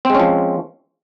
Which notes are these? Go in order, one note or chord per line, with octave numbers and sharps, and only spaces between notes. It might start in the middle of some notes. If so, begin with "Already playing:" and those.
F3 G#3 C4 C#4